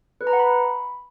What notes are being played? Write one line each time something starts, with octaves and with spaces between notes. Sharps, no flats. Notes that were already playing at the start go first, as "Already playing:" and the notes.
B4
A#5
F#5
B5